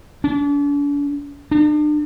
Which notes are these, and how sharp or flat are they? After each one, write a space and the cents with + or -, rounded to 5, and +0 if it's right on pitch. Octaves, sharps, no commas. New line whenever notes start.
D4 -40
D4 +40